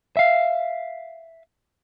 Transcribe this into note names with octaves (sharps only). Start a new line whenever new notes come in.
E5 F5